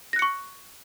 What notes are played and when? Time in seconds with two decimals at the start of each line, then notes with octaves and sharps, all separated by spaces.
0.13 A#6
0.16 F#6
0.19 C#7
0.22 C#6